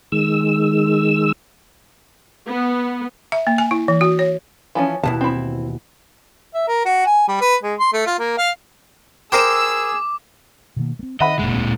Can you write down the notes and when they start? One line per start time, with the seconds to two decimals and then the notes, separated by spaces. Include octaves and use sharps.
0.12 D#3 G#3 E6
2.47 B3
3.32 E5
3.47 A#3
3.58 G#5
3.71 E4
3.88 E3
4.01 F#4
4.19 C#5
4.75 E3 F3 C#4
5.03 D#2 B2 E3 A5
5.21 C4 E4
6.54 E5
6.68 A#4
6.85 F#4
7.06 G#5
7.28 G3
7.41 B4
7.63 G#3
7.79 C6
7.93 A3
8.07 F4
8.19 A#3
8.37 F5
9.32 G#4 A#4 C5 G5 D6 E6
10.76 B2 D#3 A#3
10.99 A3 C4
11.20 D#3 D#5 E5 F#5 B5
11.39 F1 A#2 G#3
11.54 D1 C4